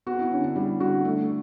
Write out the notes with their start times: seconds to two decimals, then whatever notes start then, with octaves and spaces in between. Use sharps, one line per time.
0.06 B3 F#4
0.19 E4
0.31 D3 C#4
0.44 D4
0.56 G3 E4
0.80 D3 F#4
1.05 A3 D4